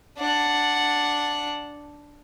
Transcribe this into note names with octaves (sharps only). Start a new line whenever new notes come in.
D4 F#5